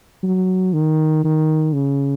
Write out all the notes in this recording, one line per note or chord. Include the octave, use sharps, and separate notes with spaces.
F#3
D#3
D#3
C#3